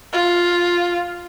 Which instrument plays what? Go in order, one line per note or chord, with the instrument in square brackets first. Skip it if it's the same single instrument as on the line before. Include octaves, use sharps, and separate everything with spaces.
[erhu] F4